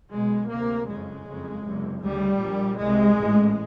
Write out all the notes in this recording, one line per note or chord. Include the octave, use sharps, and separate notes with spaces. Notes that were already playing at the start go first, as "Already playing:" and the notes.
B1 B2 G#3
D2 C3 A#3
F#1 F2 C#3 G#3
F#1 F2 C#3
F#1 E2 C3
D2 C#3 G3
A#1 A#2
C2 C3 G#3
A1 G#2